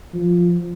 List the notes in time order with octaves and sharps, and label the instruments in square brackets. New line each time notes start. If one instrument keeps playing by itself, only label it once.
[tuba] F3